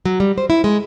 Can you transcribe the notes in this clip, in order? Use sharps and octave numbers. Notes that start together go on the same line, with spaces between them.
F#3
G3
C5
E4
G#3